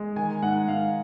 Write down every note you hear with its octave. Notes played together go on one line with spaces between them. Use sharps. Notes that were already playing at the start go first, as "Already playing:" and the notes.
Already playing: G#3
D#3 G#5
G#2 F#5
G#2 F5